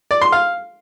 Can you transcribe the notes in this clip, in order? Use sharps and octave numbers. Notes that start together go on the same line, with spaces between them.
D5
C6
F5